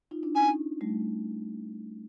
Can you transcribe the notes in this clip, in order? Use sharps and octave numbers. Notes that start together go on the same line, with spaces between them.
D#4 F4
D4 E4
C#4 D#4 G#5
G3 A3